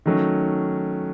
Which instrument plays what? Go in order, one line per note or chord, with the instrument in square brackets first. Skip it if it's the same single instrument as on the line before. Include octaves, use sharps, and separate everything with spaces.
[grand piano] D#3 F#3 A3 C#4